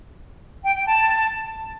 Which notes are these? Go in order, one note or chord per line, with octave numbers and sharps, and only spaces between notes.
G5
G5
A5